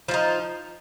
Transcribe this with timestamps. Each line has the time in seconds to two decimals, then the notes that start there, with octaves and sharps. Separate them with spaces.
0.08 F3
0.11 F4
0.14 D#4